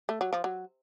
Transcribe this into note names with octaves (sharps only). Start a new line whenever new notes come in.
A3
F#3
F3
F#3